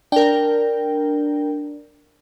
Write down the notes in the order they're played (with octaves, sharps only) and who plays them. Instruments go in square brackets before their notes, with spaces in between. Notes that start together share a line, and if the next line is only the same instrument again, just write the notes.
[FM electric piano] D4 [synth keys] A#4 G5